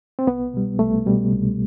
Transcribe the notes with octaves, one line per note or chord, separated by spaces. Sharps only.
C4
C2 B3
B2 G3
C2 A3
B2 G3
C2